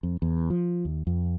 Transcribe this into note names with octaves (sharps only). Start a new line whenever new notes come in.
F2
E2
F3
D#2
F2